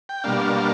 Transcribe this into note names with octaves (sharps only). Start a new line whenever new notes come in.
G5
B2 G3 A#3 D4 F5